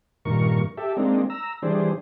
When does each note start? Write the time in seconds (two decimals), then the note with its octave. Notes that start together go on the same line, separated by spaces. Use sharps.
0.25 G2 A#2 D#3 A#4 C#6
0.77 G4 A4 E5
0.97 G#3 A#3 C4 D4 D#4
1.30 A#5 E6
1.62 E3 G3 D4 G#4 C5